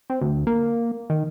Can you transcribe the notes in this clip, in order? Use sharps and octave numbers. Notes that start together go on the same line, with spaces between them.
C4
D2
A#3
D#3